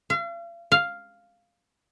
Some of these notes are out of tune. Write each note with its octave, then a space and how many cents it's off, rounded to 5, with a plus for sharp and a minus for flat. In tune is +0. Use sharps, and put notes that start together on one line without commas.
F5 -40
F5 +0